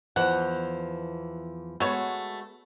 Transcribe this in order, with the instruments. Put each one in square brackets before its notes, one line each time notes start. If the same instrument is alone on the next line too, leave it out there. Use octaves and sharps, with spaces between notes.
[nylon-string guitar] E2 E3 F3 [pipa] F#5
[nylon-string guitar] G#3 B3 F#4 [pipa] A3 C#5